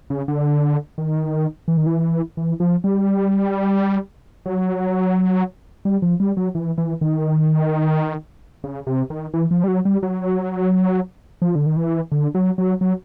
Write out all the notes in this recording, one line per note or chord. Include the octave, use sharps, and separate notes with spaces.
C#3
D3
D#3
E3
D#3
E3
E3
F3
G3
F#3
G3
F3
G3
F#3
E3
E3
D#3
C#3
C3
D#3
E3
F3
G3
F#3
G3
F#3
F3
D3
D#3
E3
D3
F#3
F#3
F#3